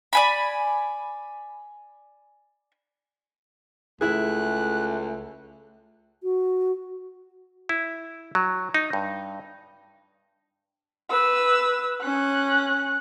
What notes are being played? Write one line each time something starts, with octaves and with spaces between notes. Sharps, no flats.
D5 G#5 B5
C#2 A3 E4 G#4 F#6
F#4
E4
F#3
D#4
G2
B4 E6
C#4 F#6